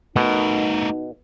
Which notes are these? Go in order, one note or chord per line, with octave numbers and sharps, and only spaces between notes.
B2 A3 D#4 A#4